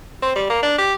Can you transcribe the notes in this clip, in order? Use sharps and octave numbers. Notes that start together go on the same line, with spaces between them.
C4
G3
A#3
D4
G4